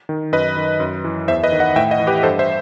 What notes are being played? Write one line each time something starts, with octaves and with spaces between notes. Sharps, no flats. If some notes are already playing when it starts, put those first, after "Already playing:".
D#3
F#2 B4 D#5
D#3
F#2
E3
E2 C5 E5
B4 D#5
D#3
D#5 F#5
A2 E5 G5
D#5 F#5
E3
G4 B4
G2 A4 C5
C5 E5